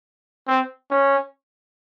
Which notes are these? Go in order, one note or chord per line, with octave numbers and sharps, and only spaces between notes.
C4
C#4